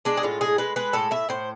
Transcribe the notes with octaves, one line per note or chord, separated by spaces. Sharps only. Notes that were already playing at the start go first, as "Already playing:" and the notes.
G#3 D4
G#4
A2 F4
G#3 G#4
G#3 B4
G#3 B4
A2 A4
A2 E5
A2 C5